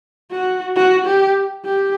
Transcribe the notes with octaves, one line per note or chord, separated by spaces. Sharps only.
F#4
F#4
G4
G4